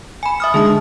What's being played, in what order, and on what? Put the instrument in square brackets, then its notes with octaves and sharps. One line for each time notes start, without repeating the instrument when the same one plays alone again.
[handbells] G#5 B5
E5 D#6 F6
[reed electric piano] D3 G#3 D#4 [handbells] G#4 A5 D#6